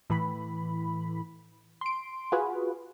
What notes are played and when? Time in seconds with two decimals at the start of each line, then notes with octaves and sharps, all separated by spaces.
0.10 A2 E3 B5
1.81 C6 D7
2.32 F4 F#4 G#4 B4